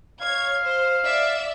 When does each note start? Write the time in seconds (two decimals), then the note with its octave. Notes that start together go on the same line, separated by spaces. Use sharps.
0.21 C#5 F5 G#6
0.62 C5
1.05 D5 E5